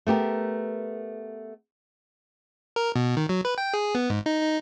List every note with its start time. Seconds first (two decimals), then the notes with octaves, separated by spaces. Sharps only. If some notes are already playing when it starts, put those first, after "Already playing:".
0.07 A3 B3 G4 A#4
2.76 A#4
2.96 B2
3.17 D#3
3.29 F#3
3.45 B4
3.58 G5
3.74 G#4
3.95 B3
4.10 G#2
4.26 D#4
4.43 D#4